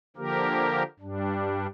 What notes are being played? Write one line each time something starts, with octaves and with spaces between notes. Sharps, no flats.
D3 F3 A#3 G4 A#4
G2 G3 D4